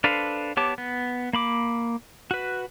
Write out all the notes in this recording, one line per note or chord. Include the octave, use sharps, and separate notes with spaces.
D4 A4 B4 C5 F5
B3 G4 C#5 A5 D6
B3
A#3 B5 D6
F#4 B4